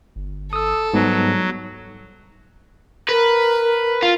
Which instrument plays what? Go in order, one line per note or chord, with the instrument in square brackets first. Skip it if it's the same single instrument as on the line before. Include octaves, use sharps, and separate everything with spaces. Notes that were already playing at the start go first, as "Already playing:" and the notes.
[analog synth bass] G1
[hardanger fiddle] A4 [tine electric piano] D#6 E6
[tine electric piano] G#2 B3 [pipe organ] F#3 [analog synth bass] G3
[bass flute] A#4 [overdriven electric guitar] B4
[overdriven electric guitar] F4